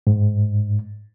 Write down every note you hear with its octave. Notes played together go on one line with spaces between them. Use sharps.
G#2